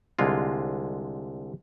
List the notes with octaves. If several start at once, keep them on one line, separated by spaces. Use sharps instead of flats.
C2 D3 G#3 F4